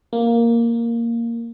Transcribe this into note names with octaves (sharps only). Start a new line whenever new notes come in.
A#3